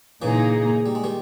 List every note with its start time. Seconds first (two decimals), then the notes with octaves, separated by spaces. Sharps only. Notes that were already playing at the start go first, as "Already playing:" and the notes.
0.21 A#2 C#3 E3 A#3 D#4 G#4
0.86 G3
0.95 G#3
1.04 D#3 G3